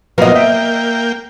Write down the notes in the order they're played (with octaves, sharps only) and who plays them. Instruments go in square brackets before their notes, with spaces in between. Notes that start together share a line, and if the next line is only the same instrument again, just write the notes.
[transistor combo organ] A#2 F3 F#3 [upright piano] B3 C4 [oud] A#4 D#5
[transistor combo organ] A#3 G5 [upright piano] E5 D7